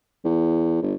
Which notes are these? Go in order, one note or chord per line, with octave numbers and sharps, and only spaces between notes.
E2
G1